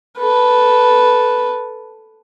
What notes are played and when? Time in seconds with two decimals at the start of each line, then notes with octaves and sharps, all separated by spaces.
0.19 A4 B4